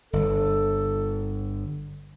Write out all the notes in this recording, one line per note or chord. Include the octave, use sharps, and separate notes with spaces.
G1 A4